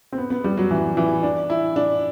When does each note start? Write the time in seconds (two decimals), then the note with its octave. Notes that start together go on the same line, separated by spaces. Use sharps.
0.12 C4
0.18 B3
0.30 B3
0.44 G3
0.57 F#3
0.71 E3
0.97 E3
1.23 D4
1.50 E4
1.76 D4